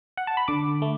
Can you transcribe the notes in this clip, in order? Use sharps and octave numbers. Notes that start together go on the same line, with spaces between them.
F#5
A5
B5
D3 D6
A3